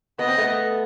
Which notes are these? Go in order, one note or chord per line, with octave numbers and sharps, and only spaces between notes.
B3 D#5
C4
A3 B3